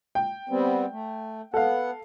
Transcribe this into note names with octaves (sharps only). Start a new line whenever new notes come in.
G5
G3 B3 C4
A3
B3 A4 F5 F#5